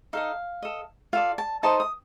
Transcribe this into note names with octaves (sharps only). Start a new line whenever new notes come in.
D#4 A4 D#5 F5
A4 D#5
F4 A4 D5 F5
A5
D#4 A4 C5 D#5 A5
D#6